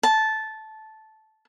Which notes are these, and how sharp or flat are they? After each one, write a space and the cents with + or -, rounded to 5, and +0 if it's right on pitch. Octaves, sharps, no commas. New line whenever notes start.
A5 -10